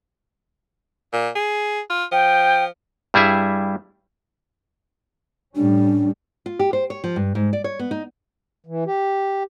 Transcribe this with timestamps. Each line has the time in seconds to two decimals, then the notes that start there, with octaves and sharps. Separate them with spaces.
1.13 A#2
1.36 G#4
1.90 F4
2.12 F3 G5
3.14 G2 G3 E4 G#4 E5
5.56 A2 G3 C#4 D4
6.46 F4
6.59 G4
6.73 C5
6.90 C#5
7.04 F3
7.16 G2
7.35 G#2
7.53 D5
7.64 C#5
7.79 B3
7.91 D#4
8.66 E3
8.87 G4